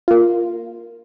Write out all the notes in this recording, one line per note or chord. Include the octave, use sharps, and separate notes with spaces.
A#3 F4